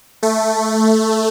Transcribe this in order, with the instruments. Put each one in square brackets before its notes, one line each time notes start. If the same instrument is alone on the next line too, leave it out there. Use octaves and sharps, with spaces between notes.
[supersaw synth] A3